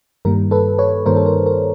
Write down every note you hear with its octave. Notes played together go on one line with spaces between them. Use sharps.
G2 D#3 G3 A#3 A#4
A4 B4
B4 C#5
G2 D#3 G3 A#3 A#4 C5
A4
A#4
A#4